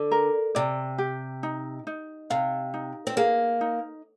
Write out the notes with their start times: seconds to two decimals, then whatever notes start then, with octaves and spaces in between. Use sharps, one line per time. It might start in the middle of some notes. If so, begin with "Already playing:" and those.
Already playing: D3
0.11 A#4
0.55 C3 D5
0.98 G4
1.43 D#4
1.87 D#4
2.30 C3 F5
2.74 D#4
3.07 C4
3.17 A#3 G#4
3.61 D#4